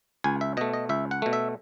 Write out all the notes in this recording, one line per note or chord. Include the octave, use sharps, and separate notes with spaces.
C#2 G#5
E5
B2 A3 D#5
D#5
C#2 E5
F#5
B2 A3
E5